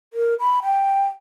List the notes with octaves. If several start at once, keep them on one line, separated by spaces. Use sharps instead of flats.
A#4
B5
G5